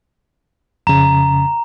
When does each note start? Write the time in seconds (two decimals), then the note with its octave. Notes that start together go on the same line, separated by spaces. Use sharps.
0.87 F2 C#3 A#5